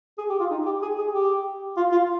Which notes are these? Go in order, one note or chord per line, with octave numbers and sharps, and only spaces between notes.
G#4
G4
F4
D#4
G4
G#4
G#4
G4
F4
F4